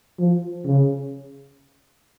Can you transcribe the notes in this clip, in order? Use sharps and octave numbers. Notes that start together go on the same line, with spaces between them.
F3
C#3